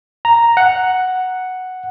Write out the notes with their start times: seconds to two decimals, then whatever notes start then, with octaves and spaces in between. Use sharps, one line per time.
0.25 A#5
0.57 F#5